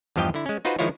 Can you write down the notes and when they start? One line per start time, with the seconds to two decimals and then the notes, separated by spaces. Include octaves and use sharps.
0.16 E2 G2 F3 G4 D#5 G5
0.34 D3 E4
0.46 G#3 C#4
0.65 D#4 F4 F#4 B4 C5
0.79 D#3 F3 G#3 E4 F4 C#5